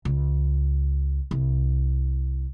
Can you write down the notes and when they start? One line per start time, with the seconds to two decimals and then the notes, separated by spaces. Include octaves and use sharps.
0.05 C#2
1.31 C2